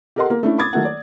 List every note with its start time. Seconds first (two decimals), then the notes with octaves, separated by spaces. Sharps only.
0.16 G4 A4 A#4 D#5 F#5 C6
0.30 A#3
0.43 A3 C#4 D4 E4
0.58 B5 D6 D#6 G#6 A6
0.73 D#3 F#3 A3 A#3 F#5
0.85 D5